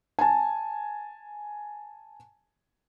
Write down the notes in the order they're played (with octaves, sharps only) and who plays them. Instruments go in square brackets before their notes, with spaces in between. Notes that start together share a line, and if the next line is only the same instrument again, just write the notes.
[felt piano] G#5 A5